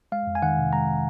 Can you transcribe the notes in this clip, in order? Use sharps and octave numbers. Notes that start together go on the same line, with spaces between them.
G#3 F5
F2
G#5
D#3 F#5
C3
G#3 A#5